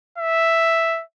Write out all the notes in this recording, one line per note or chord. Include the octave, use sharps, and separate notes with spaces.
E5